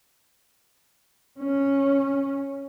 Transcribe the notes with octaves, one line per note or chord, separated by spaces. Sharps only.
C#4